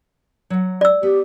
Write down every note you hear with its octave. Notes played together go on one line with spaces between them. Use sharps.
F#3 F#5
D5 E6
B3 G4